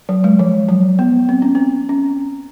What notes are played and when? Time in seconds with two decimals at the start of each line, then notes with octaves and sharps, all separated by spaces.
0.09 F#3
0.24 G#3
0.39 F3
0.69 F#3
0.99 B3
1.29 C4
1.42 C#4
1.55 C4
1.89 C#4